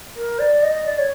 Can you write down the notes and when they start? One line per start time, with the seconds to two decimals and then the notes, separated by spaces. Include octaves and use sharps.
0.15 A#4
0.39 D5
0.62 D#5
0.85 D5
0.98 C#5